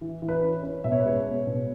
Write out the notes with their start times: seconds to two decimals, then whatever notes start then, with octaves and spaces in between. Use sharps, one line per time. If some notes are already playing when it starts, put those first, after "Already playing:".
0.01 E3
0.22 E3
0.28 B4
0.43 C#4
0.63 C#4
0.84 B2 E5
0.92 C#5
1.00 B4
1.05 G#3 C#5
1.26 B3
1.47 B2